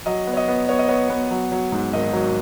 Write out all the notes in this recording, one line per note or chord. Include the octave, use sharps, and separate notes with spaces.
F#3 D#5
B3
C#5
D#5
B3
B3 C#5
D#5
B3 C#5
B3
F#3
F#3
G#2
G#1 D#5
F#3